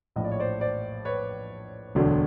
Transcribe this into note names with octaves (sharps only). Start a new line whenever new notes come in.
A#1 A2 F3 D#5
D5
C#5
C5 D5
C5 D5
B4 C#5
E1 D2 D3 F#3